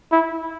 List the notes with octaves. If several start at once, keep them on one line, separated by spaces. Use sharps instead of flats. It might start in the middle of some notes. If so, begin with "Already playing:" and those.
E4